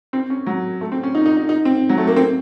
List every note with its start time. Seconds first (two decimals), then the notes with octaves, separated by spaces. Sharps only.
0.13 C4
0.30 C#4
0.46 F#3
0.81 A3
0.92 C4
1.03 C#4
1.15 D#4
1.26 D#4
1.37 D#4
1.49 D#4
1.65 C4
1.89 F#3
1.98 A3
2.07 A#3
2.16 C4